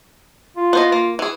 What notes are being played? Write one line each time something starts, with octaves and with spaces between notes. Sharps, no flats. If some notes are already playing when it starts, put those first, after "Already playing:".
F4
B3 C5 D#5
A#3
E3 G#4